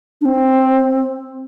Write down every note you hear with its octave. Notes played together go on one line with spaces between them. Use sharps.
D4
C4